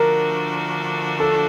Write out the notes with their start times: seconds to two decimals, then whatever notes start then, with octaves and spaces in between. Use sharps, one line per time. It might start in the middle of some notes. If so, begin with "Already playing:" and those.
Already playing: D3 F3 A3 D4 F#4 A#4
1.20 A4